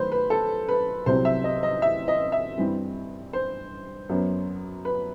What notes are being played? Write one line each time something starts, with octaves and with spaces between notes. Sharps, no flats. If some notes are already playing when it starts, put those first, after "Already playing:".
Already playing: D#3 F#3 A3 B4 C5
B4
A4
B4
C2 C3 F#3 C4 C5
E5
D#5
D#5
E5
D#5
E5
G2 E3 G3 C4
C5
F#2 F#3 B3
B4